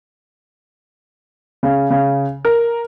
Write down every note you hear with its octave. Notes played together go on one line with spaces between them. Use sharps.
C#3
C#3
A#4